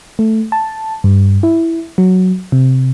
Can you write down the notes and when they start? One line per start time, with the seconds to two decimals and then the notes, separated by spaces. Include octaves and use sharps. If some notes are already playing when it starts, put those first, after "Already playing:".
0.19 A3
0.52 A5
1.04 G2
1.43 E4
1.98 F#3
2.52 C3